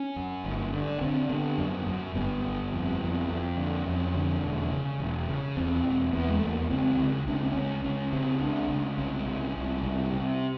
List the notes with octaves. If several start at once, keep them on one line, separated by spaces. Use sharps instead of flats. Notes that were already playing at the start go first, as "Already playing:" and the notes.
Already playing: C#4
F#2
G1
D3
D3 C4
D3 B3
F#2
F#2
G1 B3
G1
F2
F2
F2
D3
F2 C#4
D3
E1
C#3
E1
C#3
E2 C4
E1
E2 B3
G#3
E2 A3
A#3
B3
C#2 C4
C#2
C#2 D4
C#4
C4
C#2 C#4
C#2 C#4
C#3 C4
C#2 D4
C#2
C2 C#4
C2
C2
C2
C3